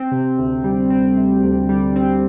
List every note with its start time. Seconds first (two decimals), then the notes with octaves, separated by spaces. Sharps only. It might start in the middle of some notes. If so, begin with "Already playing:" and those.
Already playing: C4
0.12 C3
0.38 D2
0.64 G3
0.90 C4
1.17 C3
1.43 D2
1.69 G3
1.96 C4